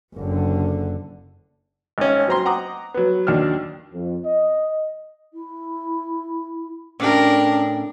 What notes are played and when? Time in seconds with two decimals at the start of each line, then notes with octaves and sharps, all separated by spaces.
0.15 F#1 D3
1.98 G#1 C#4
2.27 F#3 C4 A#5 C6
2.45 F#5 A#5 D6 D#6
2.94 F#3 B3
3.27 D#2 F#3 D4 F6
3.93 F2
4.25 D#5
5.33 E4
7.00 A2 C#4 D4 A#4 G5